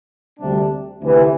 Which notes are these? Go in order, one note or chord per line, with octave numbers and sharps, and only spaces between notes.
D2 C3 G3 D4
D2 C3 E3